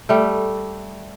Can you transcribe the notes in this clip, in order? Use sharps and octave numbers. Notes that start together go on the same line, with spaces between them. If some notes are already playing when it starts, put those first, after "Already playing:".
G3 A3